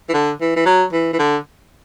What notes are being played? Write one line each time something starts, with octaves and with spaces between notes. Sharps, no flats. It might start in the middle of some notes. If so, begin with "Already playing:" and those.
E3
D3
E3
E3
F#3
E3
E3
D3